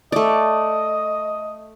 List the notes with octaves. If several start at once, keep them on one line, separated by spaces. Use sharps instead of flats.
A3 D5 D#5